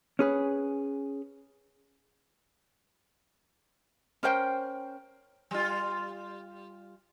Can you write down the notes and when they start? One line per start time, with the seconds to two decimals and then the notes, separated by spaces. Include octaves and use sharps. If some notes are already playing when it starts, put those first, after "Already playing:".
0.19 C#4 G#4 B4
4.23 C#4 A#4 C5 G5
5.51 G3 F4